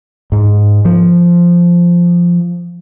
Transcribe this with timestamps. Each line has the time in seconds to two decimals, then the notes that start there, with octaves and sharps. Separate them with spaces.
0.32 G#2
0.85 F3